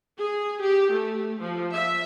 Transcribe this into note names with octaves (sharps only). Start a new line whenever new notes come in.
G#4
G4
A3
F3
E5